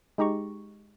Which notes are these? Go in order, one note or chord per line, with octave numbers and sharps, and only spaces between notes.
G#3 D#4 G4 A#5 C#6